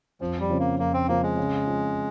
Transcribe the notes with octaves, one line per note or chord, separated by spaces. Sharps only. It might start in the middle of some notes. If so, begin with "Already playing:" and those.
F2 F3
G3
C#3 F3 C4
A#3
F2 A#3
C4
C#3 F3 A#3 C4
G#3
C#3
F3 C4